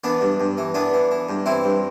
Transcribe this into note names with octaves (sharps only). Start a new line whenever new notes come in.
E3 B3 D4
G2
G2
E3
E3 B3 D4
E3
E3
G2
E3 C4 E4
G2